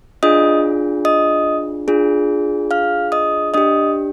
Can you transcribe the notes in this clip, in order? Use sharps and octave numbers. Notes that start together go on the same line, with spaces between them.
D4 F4 G#4 D#5 D#6
D#5 D#6
D4 F4 G#4
F5 F6
D#5 D#6
D4 G4 D#5 D#6